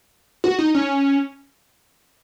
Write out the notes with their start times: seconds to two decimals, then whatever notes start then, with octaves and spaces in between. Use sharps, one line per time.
0.44 F#4
0.58 D#4
0.75 C#4